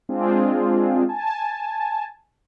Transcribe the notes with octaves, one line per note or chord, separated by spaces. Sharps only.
G#3 C4 D4 F4 G#4
G#5 A5